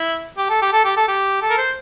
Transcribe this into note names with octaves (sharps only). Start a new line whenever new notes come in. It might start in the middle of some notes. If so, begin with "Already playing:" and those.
Already playing: E4
G4
A4
G4
A4
G4
A4
G4
A4
A#4
C5